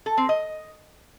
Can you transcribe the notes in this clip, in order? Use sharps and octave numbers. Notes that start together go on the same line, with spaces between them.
A4
C4
D#5